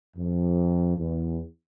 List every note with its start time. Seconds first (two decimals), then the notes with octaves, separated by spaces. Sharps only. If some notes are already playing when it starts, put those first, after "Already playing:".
0.17 F2
0.97 E2